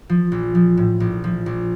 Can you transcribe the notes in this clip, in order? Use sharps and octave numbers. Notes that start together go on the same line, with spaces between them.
F3
A#1
F3
A2
A#1
F3
A#1